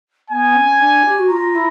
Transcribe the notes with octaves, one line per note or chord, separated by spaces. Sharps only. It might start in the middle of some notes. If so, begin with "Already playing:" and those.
B3 G#5
C#4
D4
G4
F#4
F4 A#5
E4